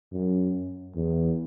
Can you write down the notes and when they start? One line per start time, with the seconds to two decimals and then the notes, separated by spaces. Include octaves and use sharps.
0.12 F#2
0.95 E2